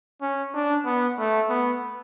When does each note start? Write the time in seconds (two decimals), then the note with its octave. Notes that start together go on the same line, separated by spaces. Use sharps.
0.22 C#4
0.54 D4
0.85 B3
1.18 A3
1.49 B3